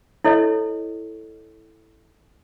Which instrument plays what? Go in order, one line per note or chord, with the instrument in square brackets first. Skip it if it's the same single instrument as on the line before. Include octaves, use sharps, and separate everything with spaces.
[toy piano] E4 A4 C#5 D#5